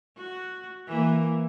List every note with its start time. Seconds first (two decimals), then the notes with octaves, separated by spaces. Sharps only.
0.17 F#4
0.87 E3 A#3